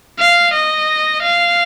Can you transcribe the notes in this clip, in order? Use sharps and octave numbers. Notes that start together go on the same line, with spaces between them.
F5
D#5
F5